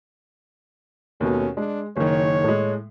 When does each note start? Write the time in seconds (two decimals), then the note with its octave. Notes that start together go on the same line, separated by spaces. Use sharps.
1.21 D#2 B2 A3 C#4
1.57 G#3 D4
1.97 F#1 D#3 C#5
2.44 A2 G#3